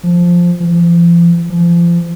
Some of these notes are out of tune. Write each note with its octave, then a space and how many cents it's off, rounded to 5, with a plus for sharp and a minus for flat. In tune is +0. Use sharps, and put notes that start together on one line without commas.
F3 +0
F3 -40
F3 -30